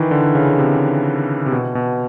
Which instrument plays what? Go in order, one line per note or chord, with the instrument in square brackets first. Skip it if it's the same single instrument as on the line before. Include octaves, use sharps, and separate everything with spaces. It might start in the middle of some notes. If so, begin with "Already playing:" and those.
Already playing: [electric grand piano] D#3 E3
D3
C#3
C3
C3
B2
B2